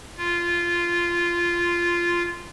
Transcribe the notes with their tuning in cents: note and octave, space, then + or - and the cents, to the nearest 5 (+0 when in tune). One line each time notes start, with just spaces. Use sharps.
F4 -10